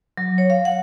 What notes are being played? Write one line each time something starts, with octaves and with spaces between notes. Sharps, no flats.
F#3
C#5
F5
F#5